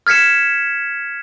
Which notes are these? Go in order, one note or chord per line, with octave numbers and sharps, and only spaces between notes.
F6 G#6 B6 C#7 E7